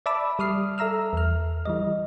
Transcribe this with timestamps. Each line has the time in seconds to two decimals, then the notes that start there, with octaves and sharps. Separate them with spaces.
0.06 D5 E5 A5 B5 D6 E6
0.39 G3 D#6 F6 C7
0.78 A4 E5 A#5 E6 F6
1.13 E2 F6
1.66 E3 G3 D#5